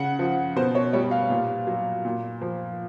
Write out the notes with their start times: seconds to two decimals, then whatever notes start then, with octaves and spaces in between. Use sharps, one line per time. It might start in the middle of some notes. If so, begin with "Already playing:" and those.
Already playing: C#3 F#5
0.19 F3
0.56 B2 C5
0.75 C#5
0.93 G3 C#5
1.11 F5
1.30 A#2
1.67 F#3
2.05 A#2
2.41 F3